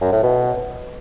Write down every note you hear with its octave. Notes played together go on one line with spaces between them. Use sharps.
F#2
A2
B2